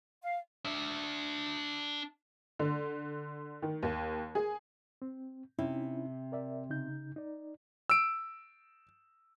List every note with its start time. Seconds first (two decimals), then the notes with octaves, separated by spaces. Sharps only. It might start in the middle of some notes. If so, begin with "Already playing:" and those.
0.21 F5
0.65 D4 E5
2.59 D3
3.62 D#3
3.83 D#2
4.35 G#4
5.02 C4
5.59 C3 C#4 D#4 E4
6.32 A#4 D5 E5
6.70 C#3 D#4 G6
7.16 D#4 D5
7.90 E6 D7